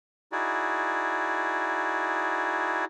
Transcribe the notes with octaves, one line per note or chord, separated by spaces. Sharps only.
D#4 E4 F#4 G#4 D5